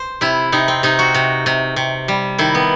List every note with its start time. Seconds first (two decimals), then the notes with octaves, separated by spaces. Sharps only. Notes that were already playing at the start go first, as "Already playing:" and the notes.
Already playing: C5
0.21 C3 E4
0.52 C3 D#4
0.68 C4
0.83 C3 D#4
0.99 F#4
1.14 C3
1.46 C3
1.76 C3
2.08 G3
2.38 D#3 E4
2.55 B3